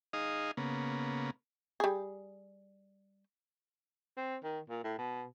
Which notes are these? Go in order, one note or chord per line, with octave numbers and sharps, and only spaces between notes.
D#4 G#4 D#5 F5
C#3 A#3 B3
G3 G#4
C4
D#3
A#2
A2
B2